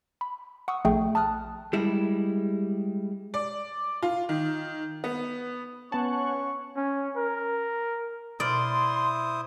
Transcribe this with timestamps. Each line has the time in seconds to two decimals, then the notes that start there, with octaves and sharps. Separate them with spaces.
0.21 B5
0.68 F#5 C#6 D#6 E6
0.85 A#1 A3 G#4 G5
1.15 A5 D#6 F6 F#6
1.73 G3 G#3 E4
3.34 D5
4.02 F4
4.29 D#3
5.04 B3
5.92 B3 C#4 C#5 F#5 A5 C#6
6.76 C#4
7.17 A#4
8.40 B2 E4 C5 D5 C6 D#6 F6